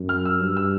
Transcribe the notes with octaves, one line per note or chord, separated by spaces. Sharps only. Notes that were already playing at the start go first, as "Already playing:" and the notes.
Already playing: F#2
F6
E6
G2
E6